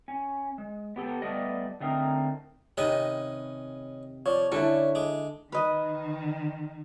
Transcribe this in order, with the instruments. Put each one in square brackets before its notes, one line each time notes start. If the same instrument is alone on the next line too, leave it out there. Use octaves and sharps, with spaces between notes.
[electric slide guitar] C#4
G#3
B3 G4 A4
G3 A3 B3 D5 D#5
D3 A3 C4 D#4 A#4
[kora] C3 D#3 [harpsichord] C#4 B4 D#5
[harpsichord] F3 [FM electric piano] C#5 D5
[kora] D3 [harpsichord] C#4 [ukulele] E4 A4
[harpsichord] G#3 D6
[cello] D#3 [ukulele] B4 D#5